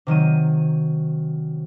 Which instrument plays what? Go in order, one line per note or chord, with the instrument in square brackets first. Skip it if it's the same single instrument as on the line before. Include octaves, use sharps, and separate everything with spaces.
[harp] C3 D#3 F#3 D#7